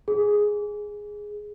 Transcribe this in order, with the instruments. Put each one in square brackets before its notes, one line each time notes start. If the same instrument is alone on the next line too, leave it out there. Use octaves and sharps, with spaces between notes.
[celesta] G#4